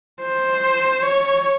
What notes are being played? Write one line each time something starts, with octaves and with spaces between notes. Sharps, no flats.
C5
C#5